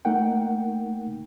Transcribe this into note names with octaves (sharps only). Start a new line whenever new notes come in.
A3 A#3 D#4 A#4 F#5 G5